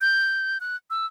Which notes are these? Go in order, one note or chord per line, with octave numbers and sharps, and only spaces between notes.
G6
F#6
E6